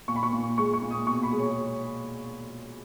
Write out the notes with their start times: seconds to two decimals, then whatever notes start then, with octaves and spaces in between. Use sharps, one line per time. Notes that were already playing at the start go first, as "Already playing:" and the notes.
0.08 A#2 C#6
0.16 B5
0.23 C#6
0.33 A#2
0.58 G#3 C#6
0.73 C#6
0.82 A#2
0.91 D#6
1.06 B2 C#6
1.23 B5
1.32 G#3
1.39 C#5